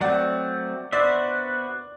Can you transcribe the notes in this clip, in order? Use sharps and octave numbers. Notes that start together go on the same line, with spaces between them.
F#3 A3 C4 D5 F#5
B3 F#4 C5 D5 E5